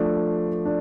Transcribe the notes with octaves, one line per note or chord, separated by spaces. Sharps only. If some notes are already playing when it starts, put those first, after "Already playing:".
Already playing: F3 A3 D4
D4